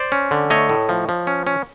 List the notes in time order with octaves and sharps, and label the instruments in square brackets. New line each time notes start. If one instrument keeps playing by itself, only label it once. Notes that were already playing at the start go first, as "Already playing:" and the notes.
Already playing: [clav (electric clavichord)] C5 D5
C#4
D3
A3 C#5 D#5
A2
F3
F3
C#4
C#4